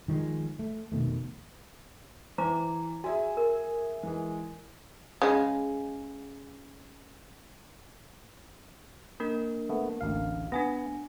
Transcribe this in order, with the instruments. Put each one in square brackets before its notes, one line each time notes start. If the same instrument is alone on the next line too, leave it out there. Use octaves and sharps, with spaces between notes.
[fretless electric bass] D#3 F3 G3 G#3
A3
F1 B2 D#3 A3
[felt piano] E3 [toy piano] C5 A#5 D6
[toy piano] F#4 [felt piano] G#4 E5 G#5
[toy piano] A#4
[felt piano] E3 G#3
[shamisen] C#3 G#3
[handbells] A#3 D4 A#4
[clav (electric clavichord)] A3 B3
A1 D2 F5
[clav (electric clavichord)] B3 [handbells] D4 G#5 A#6